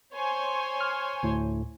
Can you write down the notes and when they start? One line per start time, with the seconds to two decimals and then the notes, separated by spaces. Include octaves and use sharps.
0.14 C5 C#5 G#5
0.81 F6
1.23 D2 A2